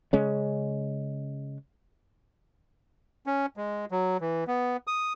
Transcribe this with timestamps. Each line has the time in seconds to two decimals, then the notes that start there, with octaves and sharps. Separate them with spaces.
0.13 C#3 G#3 C#4
3.26 C#4
3.57 G#3
3.91 F#3
4.21 E3
4.47 B3
4.87 D#6